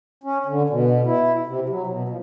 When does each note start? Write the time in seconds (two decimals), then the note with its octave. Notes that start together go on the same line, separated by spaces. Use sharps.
0.24 C#4
0.46 D3
0.69 B2
1.06 E4
1.47 C3
1.69 F#3
1.87 B2
2.09 F3